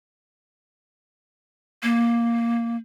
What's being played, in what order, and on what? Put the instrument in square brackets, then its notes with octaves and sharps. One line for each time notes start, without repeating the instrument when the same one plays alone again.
[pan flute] A#3